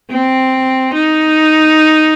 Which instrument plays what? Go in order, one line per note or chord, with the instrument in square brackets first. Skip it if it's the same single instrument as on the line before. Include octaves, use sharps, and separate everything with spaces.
[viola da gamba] C4
D#4